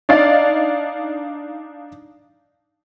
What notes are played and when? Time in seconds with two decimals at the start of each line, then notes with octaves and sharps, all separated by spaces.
0.09 D4 D#4 D5 F5